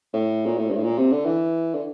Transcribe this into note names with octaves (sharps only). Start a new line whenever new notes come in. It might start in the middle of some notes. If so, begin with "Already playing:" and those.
A2
A#2
A2
G2
A2
A#2
C3
D3
E3
D3